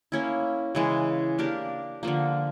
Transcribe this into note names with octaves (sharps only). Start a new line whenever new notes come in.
A#3 C#4 E4
C#3 E3 G#3
A#3 D4 G4 A#4
D3 F3 A#3